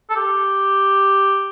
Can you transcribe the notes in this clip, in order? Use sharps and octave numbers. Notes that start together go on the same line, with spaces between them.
A4
G4